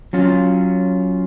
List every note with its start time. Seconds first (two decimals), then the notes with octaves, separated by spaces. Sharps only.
0.13 F#3 C#4 F4